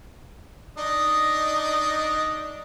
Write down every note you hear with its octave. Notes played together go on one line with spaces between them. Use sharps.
D4 D#4 D#5